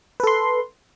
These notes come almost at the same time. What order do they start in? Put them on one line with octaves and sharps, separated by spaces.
B4 A4 C6